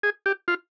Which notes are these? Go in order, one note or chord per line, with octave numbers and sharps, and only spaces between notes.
G#4
G4
F4